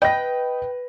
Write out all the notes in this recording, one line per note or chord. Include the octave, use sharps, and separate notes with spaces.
B4 D#5 G5 A#6